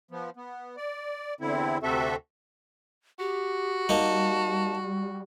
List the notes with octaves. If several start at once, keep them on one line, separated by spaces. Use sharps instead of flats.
F3 B3
B3
D5
E2 D3 C4 E4
D2 C3 C4 F#4 A4 E5
F#4 G4
G3 A#3 D#4 A5